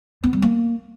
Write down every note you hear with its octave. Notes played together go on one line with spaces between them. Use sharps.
B3
G3
A#3